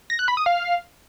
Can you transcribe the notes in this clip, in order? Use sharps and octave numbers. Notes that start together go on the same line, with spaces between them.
A#6
F#6
B5
D#6
F5